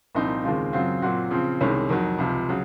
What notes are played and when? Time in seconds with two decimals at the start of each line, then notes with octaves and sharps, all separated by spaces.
0.15 C2 A#2 F3 C4 D#4
0.44 D#2 C#3 G#3 C4 F4
0.73 F#2 C#3 F#3 C4 F4
1.02 A#2 F#3 C4 F#4
1.31 C#3 F3 C4
1.60 C2 C3 D#3 G#3 C#4
1.89 F2 D#3 F#3
2.18 C#2 C3 F3
2.49 C#3 F#3